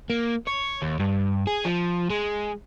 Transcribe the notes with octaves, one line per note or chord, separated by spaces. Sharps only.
A#3
C#5
D#2
G2
G#4
F3
G#3